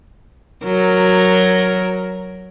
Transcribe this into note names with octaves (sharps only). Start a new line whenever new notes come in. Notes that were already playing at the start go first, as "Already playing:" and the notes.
F#3 A#4